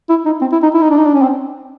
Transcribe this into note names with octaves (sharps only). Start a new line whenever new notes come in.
E4
D#4
C4
E4
D#4
E4
D#4
D4
D#4
D4
C#4
C4